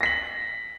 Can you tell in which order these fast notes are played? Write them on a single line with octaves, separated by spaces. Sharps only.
A#6 B6 F#7